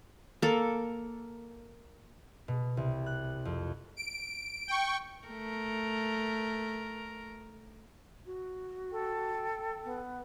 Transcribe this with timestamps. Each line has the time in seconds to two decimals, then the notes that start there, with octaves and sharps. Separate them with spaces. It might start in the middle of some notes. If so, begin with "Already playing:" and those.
0.42 A#3 A4
2.48 B2
2.77 C2
3.06 F#6
3.45 F2
3.97 D7
4.68 G5 C#6
5.27 A3 A#4
8.26 F#4
8.92 A4 G5
9.84 B3